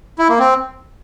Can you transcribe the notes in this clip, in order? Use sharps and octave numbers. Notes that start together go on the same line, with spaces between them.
E4
A#3
C4